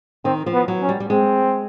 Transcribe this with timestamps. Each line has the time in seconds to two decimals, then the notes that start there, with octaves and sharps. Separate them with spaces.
0.25 D#3 C4
0.46 F3
0.53 B3
0.68 F#3
0.82 C#4
0.89 G3
1.00 G3
1.10 G#3 C4